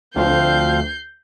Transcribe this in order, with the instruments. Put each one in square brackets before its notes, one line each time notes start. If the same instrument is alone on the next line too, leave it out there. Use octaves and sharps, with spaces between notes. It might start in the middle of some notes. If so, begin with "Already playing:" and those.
[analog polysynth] D2 [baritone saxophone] F3 [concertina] C4 F5 [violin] G6 C7